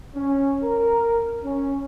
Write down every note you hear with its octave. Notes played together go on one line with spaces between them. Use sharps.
C#4
A#4
C#4